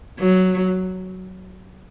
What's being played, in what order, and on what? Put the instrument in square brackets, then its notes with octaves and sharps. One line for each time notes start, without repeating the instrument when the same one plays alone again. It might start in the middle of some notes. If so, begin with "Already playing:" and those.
[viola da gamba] F#3